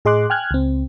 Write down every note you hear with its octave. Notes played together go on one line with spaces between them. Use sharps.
A2 G#4 D#5 C6 D6 F#6
G5 G#5 F6 F#6 G#6
C#2 C4